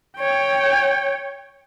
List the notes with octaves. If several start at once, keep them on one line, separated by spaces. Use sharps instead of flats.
C#5 G5